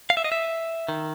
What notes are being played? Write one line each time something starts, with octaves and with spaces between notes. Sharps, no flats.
F5
E5
D#5
E5
D#3